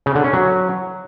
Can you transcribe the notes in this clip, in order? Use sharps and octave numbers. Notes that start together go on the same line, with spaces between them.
C#3
D3
C#4
F#3